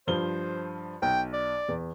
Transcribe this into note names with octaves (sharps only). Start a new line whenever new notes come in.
G2 F3 C5 G7
B1 G5
D5
E2